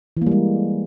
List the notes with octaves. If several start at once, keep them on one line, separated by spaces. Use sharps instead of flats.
E3 G3 G#3 A#3